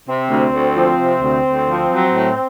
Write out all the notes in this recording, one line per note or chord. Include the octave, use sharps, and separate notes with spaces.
C3 C4
D2
D2
F3
C3
D2
D2
F3
F#3
A2